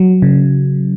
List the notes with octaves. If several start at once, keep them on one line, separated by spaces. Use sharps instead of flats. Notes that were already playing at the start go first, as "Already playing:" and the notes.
Already playing: F#3
C#3